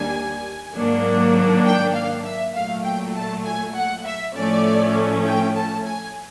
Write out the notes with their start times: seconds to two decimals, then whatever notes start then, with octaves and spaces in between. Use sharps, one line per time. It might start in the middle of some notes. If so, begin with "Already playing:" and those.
Already playing: D#2 D#3 G3 A#3 D4 G#5
0.73 G#2 D#3 F#3 A#3 D4
1.64 G5
1.94 F5
2.24 E5
2.54 A#2 F#3 A3 F5
2.84 G5
3.14 A5
3.44 G#5
3.74 F#5
4.04 E5
4.34 A2 F3 A3 C#4 D5
5.25 G5
5.55 A5
5.85 G#5